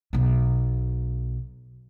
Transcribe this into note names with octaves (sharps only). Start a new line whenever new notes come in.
B1 B2